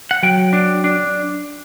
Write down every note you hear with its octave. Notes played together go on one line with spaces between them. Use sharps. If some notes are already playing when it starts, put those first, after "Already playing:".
F#5
F#3 G5
D4
D4